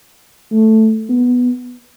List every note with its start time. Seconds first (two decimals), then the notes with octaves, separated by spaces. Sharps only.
0.51 A3
1.09 B3